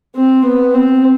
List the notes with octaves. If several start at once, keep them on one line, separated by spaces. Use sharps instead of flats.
C4
B3
C4